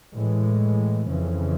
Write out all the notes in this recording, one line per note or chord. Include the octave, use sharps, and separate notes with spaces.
A2 E3 G#3
F2 C#3 E3